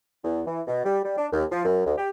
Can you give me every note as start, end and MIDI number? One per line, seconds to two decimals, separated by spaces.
0.24 0.42 40
0.47 0.62 52
0.67 0.83 47
0.85 1.00 55
1.04 1.18 55
1.18 1.28 62
1.33 1.44 39
1.52 1.65 53
1.65 1.83 42
1.86 1.94 38
1.98 2.10 67